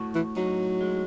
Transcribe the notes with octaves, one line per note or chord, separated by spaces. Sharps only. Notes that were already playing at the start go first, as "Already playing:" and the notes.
Already playing: A2 F#4
E3
F#3 D#4
G#3